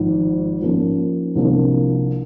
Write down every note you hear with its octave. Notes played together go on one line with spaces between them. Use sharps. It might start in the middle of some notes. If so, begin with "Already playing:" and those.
Already playing: G#1 G#2 F3
G#2 F3 A#3 C#4
C2 C3 F3 A#3 D4